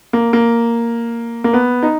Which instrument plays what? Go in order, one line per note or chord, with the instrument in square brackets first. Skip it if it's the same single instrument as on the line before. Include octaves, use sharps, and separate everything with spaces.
[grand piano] A#3
A#3
A#3
B3
D#4